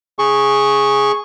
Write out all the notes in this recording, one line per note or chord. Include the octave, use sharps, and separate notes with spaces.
G#4 C#6